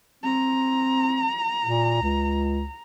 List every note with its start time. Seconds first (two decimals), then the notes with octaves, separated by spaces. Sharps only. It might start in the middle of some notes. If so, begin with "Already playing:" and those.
0.24 C4 A#5
1.65 A#2
2.02 C#2